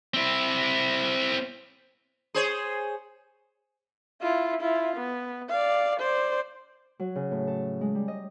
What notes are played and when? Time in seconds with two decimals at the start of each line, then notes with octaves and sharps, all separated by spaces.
0.14 C4 E4
2.34 G#4 C5 C#5
4.22 E4 F4
4.62 E4 F4
4.97 B3
5.49 D5 F5
6.00 C5 D5
7.00 F#3
7.15 C#3
7.31 A2
7.47 A4
7.81 G#3
7.95 G3
8.08 D#5